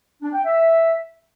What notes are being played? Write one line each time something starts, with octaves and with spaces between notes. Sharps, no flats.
D4
G5
E5